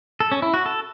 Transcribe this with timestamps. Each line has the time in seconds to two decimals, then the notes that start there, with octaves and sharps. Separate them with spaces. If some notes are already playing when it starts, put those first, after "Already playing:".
0.20 A4
0.32 C#4
0.42 E4
0.54 F#4
0.66 A4